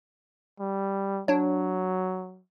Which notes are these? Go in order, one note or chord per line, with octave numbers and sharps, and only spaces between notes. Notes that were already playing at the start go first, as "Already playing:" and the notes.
G3
F#3 D4 C#5